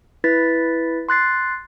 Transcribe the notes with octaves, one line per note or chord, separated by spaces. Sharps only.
E4 B4 A6 B6
C6 F#6 A6 C7